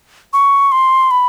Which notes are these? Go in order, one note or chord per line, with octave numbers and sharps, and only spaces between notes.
C#6
C6
B5